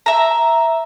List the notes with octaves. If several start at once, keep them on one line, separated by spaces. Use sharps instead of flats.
E5 A#5